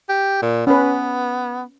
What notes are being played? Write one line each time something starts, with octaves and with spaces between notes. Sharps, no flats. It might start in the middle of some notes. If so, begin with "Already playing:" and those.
G4
A#2
B3 C#4 B4